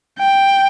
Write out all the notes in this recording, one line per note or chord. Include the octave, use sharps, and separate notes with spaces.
G5